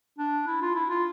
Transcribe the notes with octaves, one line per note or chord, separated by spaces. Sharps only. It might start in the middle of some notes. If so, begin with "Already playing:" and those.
D4
E4
F4
E4
F4